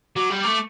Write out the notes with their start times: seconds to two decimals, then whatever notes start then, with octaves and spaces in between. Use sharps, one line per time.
0.16 F#3 D6
0.30 G3
0.42 A3 D6